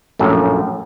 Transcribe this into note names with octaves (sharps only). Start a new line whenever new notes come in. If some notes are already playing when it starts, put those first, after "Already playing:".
A#1 F#2 A2